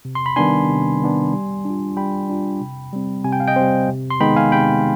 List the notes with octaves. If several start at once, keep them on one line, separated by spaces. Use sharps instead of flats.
C3
C6
B5
D#3 G3 B3 D4 G#5 C6
C3
D#3 G3 B3 D4
G3
D4 F4
G3 G5 B5
D4 F4
C3
G3 C4
C3 G#5
G5
F5
D#5 G5
G3 C4 C5
C3
C6
D#3 G#3 B3 D#4 G5 B5
F5 G#5
C3 G5 B5